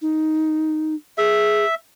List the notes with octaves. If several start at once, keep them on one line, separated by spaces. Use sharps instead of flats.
D#4
G#4 E5